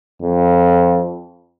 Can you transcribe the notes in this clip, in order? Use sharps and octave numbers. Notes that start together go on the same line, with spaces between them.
F2